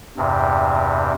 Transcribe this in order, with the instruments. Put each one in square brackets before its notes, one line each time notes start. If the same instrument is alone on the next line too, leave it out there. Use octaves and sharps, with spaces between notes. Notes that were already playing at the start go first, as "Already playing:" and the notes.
[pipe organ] E2 G2 C3